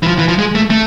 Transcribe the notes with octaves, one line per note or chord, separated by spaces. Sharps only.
E3
F3
E3
F3
G#3
A3
A3